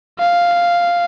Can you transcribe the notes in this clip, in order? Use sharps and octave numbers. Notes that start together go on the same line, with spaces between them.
F5